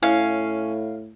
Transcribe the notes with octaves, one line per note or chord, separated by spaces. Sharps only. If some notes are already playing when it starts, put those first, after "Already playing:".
A2 C#4 E4 E5 F5